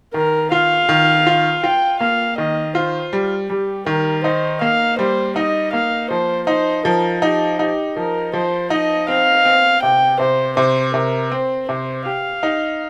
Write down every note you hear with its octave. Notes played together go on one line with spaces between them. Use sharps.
D#3 A#4
F4 F5
D#3
F4
F4 G5
A#3 F5
D#3 D#5
F4 C5
G3
G3 G4
D#3 A#4
D#4 C5
A#3 F5
G3 C5
D#4 D#5
A#3 F5
F3 C5
D#4 C5
F3 A#4
D#4 G4
D#4 G4
F3 A#4
F3 C5
D#4 D#5
C4 F5
C4
C3 G5
C3 C5
C3 C5
C3 A#4
C4 C5
C3 C5
G4 F5
D#4